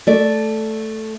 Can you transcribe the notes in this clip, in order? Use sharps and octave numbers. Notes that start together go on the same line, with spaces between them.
A3 D5